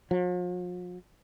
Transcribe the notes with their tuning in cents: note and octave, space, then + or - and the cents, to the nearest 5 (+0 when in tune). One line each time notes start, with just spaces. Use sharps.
F3 +45